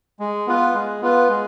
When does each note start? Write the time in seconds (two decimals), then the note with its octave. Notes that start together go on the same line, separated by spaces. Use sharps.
0.19 G#3
0.47 B3 F4 B4
0.74 G#3
1.02 B3 F4 B4
1.29 G#3